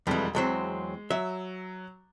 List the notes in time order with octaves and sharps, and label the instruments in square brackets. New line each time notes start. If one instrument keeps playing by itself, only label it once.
[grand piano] E1 G3 G#3 [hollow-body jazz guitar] F2 E3
[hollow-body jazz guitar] E2 F#3 C4 [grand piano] G#3
[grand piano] F#3 [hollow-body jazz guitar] E5